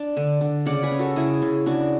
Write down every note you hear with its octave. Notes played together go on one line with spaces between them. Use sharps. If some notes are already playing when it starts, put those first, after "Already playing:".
Already playing: D4
D3
D3
C#3 D5 F#5
G#4 B4
C#4
F#4 A4
C#3 E4 G#4
C#3
C#3 D4 F#4